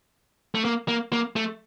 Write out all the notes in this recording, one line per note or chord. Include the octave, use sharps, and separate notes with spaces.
A3
A#3
A#3
A#3
A3